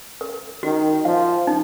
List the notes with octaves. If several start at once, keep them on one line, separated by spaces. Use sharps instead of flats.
A#4
D#3 F#4
F3 F5
D#4